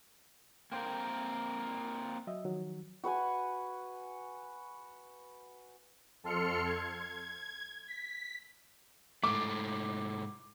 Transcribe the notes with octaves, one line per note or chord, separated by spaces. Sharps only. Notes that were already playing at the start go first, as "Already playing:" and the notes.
A#3 C4 A#4 G5 C6 G6
F#3 D#5 E5
D#3 F3 F#3
F#4 B4 F#5 G#5
F2 A4 C6 F6 C#7
G#6
B6
G#2 A3 D6